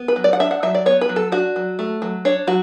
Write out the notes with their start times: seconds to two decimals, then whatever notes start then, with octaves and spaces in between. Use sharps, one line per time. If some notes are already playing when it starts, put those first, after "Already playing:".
Already playing: B3
0.08 B4
0.16 F#3
0.24 D5
0.33 F#5
0.40 D4 E5
0.51 F#5
0.63 F#3 E5
0.75 D5
0.86 B3 C#5
1.01 B4
1.09 F#3
1.16 A4
1.32 D4 F#4
1.56 F#3
1.79 A3
2.02 F#3
2.25 D4 C#5
2.47 F#3 F#4